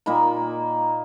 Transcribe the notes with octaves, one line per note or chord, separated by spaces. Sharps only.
A#2 A#3 D#4 B5